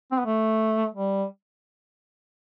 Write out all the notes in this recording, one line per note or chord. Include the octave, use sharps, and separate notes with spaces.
C4
B3
A3
G3